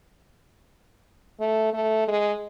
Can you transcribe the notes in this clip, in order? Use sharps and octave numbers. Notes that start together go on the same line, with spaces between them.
A3
A3
G#3